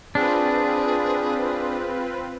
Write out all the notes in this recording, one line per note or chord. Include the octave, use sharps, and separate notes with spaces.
C4 D4 F4 G#4 B4